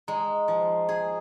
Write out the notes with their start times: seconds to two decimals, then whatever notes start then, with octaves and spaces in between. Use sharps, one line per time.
0.08 G#3 A#5
0.48 F3
0.89 G#4